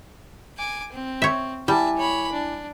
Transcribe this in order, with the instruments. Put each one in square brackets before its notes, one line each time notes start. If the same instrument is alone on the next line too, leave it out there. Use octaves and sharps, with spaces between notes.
[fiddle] G#5 D6
C4
[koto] C#5 E5
[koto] G3 [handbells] E4 G#5 D6 [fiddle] E5 A5
[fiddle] C#5 B5
D4